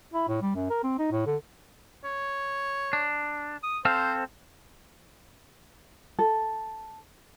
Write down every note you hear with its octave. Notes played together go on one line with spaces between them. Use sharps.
E4
A2
G3
F#2
A#4
C4
D#4
A2
D3
C#5
D4
D#6
C4 A4 C5 F5
A4